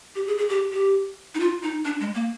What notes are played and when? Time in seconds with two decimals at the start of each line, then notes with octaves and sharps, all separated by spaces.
0.15 G4
0.27 G#4
0.38 G#4
0.49 G4
0.72 G4
1.35 D#4
1.40 F4
1.63 D#4
1.85 D4
2.00 G#3
2.14 A#3